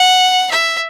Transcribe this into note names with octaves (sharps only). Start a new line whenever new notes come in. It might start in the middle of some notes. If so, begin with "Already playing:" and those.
Already playing: F#5
E5